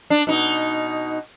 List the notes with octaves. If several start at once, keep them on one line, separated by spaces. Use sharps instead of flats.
D4
B2 D#4